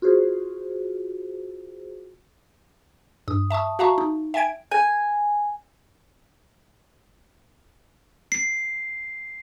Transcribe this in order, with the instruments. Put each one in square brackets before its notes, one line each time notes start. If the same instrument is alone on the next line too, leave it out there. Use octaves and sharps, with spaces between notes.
[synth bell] F4 F#4 G#4 C5
[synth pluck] G2 D#6
E5 A5 C#6 D#6
F#4 E5 F5 A5 A#5 C#6
D#4
E5 G5 G#5 G#6 D7
[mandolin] G#5
[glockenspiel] C7